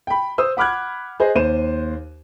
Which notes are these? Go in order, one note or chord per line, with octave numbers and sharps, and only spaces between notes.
G5 B5
C5 D#6 E6
F#5 B5 D6 F6 F#6 G#6
G#4 C5 D#5
D#2 C5 D#7 E7